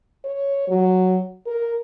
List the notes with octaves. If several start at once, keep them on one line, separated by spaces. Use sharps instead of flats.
C#5
F#3
A#4